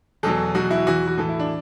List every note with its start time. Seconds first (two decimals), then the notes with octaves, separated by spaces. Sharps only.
0.23 E2 B2 F#3 A4
0.55 E2 B2 F#3 F#4
0.71 E4
0.87 E2 E3 F#4
1.07 F#4
1.17 A2 E3 A4
1.29 E4
1.39 D4